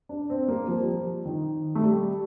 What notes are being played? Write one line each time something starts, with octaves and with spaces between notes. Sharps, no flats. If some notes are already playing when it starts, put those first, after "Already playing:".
D4
C4
A#3
F3
G3
F3
D#3
A3
G3